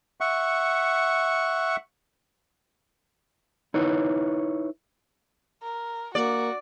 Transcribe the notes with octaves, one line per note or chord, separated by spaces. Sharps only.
E5 F#5 C#6
D#4 E4 B4 C#5
A#4
A#3 F#4 D5